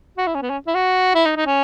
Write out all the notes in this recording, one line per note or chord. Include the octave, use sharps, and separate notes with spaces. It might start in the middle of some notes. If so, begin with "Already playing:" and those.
F#4
E4
C#4
B3
C#4
E4
F#4
E4
D#4
D#4
C#4